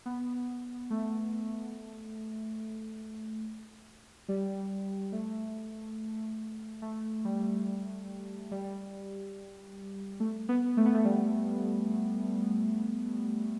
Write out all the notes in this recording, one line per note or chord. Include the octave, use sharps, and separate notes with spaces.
B3
A3
G3
A3
A3
G3
G3
A3
B3
A3
B3
A3
G3